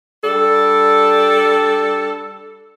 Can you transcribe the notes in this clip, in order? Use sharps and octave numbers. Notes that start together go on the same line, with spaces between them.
G3 D4 A4